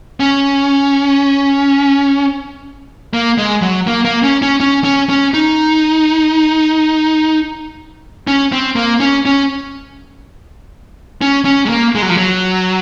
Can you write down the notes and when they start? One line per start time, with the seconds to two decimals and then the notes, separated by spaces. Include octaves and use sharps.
0.20 C#4
3.13 A#3
3.38 G#3
3.62 F#3
3.87 A#3
4.05 A#3
4.23 C#4
4.42 C#4
4.60 C#4
4.84 C#4
5.10 C#4
5.34 D#4
8.27 C#4
8.52 C4
8.76 A#3
9.00 C#4
9.25 C#4
11.21 C#4
11.45 C#4
11.66 G#3
11.69 A#3
11.95 G#3
12.02 F#3
12.09 F3
12.17 F#3